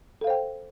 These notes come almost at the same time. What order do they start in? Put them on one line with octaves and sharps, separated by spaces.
A4 F5 C5 G5